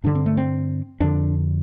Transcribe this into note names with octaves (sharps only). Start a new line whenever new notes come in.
G2 D3 D4
C4
A3
C4
F2 D3 D4